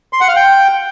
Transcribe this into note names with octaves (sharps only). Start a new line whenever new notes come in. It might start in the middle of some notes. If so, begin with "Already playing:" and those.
C6
F#5
F5
G5